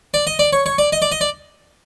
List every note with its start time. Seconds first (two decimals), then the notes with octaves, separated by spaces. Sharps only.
0.14 D5
0.27 D#5
0.39 D5
0.53 C#5
0.66 C#5
0.78 D5
0.92 D#5
1.02 D5
1.12 D#5
1.21 D5